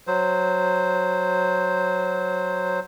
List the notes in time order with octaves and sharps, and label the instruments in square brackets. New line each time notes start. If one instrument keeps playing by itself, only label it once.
[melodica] F#3 C5